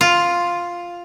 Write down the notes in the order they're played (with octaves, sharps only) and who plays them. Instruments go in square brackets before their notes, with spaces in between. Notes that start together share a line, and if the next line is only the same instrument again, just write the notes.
[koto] F4